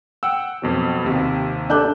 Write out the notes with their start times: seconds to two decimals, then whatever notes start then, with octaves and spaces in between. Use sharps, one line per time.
0.23 F#5 G5 E6
0.62 F2 B2 F#3
1.04 D#2 C3
1.70 D4 A4 E6 F#6 G6